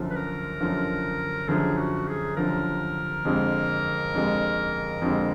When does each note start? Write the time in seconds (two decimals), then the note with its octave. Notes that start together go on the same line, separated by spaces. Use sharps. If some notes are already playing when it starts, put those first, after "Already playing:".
Already playing: F#2 D3 F3
0.10 B4
0.16 A#4
0.61 F#2 D3 F3
1.49 F#2 D3 F3 G#4
1.78 F#4
2.08 G#4
2.37 F#2 D3 F3 A#4
3.25 F2 D3 G#3
4.14 F2 D3 G#3
5.02 F2 D3 G#3